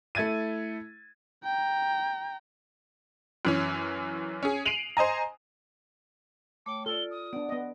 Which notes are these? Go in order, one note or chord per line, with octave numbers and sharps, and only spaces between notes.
A3 E4 G#6 A6 D#7
G5 A#5
F#2 E3 C#4
C#4 G#4
C7 D7 D#7 F7 F#7
C5 D#5 G#5 A#5
A3 C#5 G5 D6
F4 A4 D5 G7
D#6
B3 D4 D5 F#5
B3 D#5